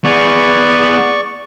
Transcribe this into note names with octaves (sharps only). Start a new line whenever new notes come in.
B3 G#4 D5 C#6